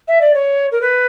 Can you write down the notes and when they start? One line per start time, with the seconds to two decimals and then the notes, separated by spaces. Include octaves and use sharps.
0.08 E5
0.21 D5
0.34 C#5
0.72 A#4
0.81 B4